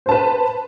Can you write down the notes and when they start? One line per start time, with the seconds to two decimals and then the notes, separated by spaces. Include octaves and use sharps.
0.06 C5
0.09 A5
0.11 B4